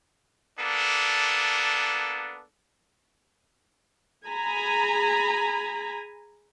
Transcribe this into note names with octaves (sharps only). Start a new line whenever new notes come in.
A#3 B3 D4 A4
G#4 G#5 A#5 B5